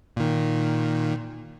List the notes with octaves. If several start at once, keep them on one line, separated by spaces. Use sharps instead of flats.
A#2 D#3